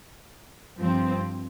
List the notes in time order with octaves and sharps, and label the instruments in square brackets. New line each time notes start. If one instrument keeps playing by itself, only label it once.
[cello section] G2 F3 C4